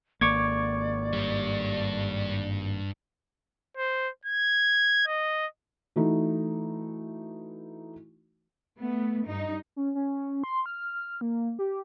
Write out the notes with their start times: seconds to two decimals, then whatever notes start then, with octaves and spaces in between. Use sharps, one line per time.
0.21 G#1 A#3 D5 C#6 D6 G#6
1.12 G2 G3
3.77 C5
4.25 G#6
5.07 D#5
5.96 E3 A3 D#4 F#4
8.79 A3 B3
9.26 G2 D#4
9.76 C#4
9.95 C#4
10.44 C6
10.66 F6
11.21 A#3
11.59 G4